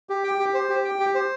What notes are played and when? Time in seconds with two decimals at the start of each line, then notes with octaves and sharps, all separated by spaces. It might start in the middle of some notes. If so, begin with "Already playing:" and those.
0.09 G4
0.24 G5
0.39 G4
0.54 C5
0.69 G4
0.85 G5
1.00 G4
1.14 C5